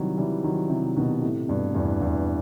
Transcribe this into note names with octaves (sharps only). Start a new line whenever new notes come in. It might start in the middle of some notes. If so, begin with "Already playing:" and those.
Already playing: C3 D#3 E3 F#3 G3
E3 G3
D#3 F#3
C3 E3
B2 D#3
A2 C3
G2 B2
E2 G2
E2 G2